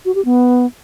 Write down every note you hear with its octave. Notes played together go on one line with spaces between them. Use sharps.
F#4
G4
B3